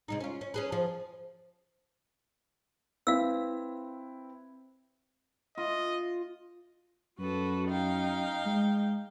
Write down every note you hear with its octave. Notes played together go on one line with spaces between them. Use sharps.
C3 G#3 D#4
C#4 F4
C#4
C#4 G#4 B4
F3 G#4
C4 E4 B4 F5 E6
F4 D#5
F#2 F#4 A4 B4
D#4 F5 G5
G#3